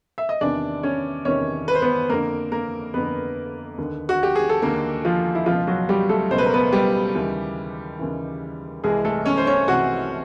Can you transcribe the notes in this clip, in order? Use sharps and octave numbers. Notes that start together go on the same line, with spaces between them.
E5
D#5
E2 C3 D#3 D4 D5
C#4 C#5
E2 C3 D#3 C#4 C#5
B4
C5
B3 B4
F2 D3 A#3 A#4
A#3 A#4
F2 D3 B3 B4
D#2 D3
F#4
G4
G#4
A4
D#2 D3 A#3 A#4
F3 F4
E4
C#2 B2 F3 F4
F#3 F#4
G3 G4
A3 A4
C#2 B2 C5
B4
A#4
B3 B4
G3 G4
D#2 C#3 E3
D#2 C#3 E3
C2 C3 E3 G#3 G#4
A3 A4
C#4 C#5
C5
C#4 C#5
C2 C3 E3 F#4 F#5